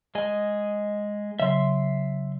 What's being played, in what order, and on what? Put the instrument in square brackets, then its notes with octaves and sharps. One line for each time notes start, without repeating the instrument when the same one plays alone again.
[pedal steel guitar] G#3 D#5 G#5
[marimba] C#3 F#3 [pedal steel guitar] E5 C6